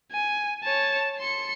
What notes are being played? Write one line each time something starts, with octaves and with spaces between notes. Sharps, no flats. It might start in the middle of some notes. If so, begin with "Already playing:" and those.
G#5
C#5 A5
C6 C#7